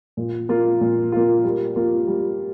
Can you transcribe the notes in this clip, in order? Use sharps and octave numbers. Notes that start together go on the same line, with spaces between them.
A#2
A#3 F4
A#2
A#3 F4
G3
A#3 F4
G3